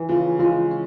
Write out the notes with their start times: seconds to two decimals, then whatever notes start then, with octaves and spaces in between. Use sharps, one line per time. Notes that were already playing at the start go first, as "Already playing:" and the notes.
Already playing: E3
0.09 C#3 F4
0.40 G#3 F4
0.71 C#4